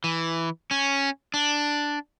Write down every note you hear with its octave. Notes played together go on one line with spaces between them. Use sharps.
E3
C#4
D4